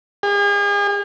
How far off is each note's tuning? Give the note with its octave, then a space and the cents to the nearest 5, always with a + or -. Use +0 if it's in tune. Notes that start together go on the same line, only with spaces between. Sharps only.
G#4 -40